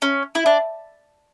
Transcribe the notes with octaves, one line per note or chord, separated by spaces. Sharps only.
C#4
E4
D4